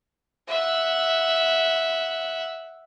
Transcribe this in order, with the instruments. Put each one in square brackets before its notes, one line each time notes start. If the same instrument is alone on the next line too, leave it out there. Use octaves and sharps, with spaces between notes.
[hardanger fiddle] E5 F#5